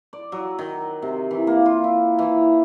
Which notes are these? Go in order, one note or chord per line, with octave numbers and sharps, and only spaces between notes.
D5
F#3
D#3
C3
E3
A#3
F4
E4
E3